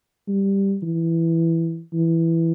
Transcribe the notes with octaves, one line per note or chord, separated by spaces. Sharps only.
G3
E3
E3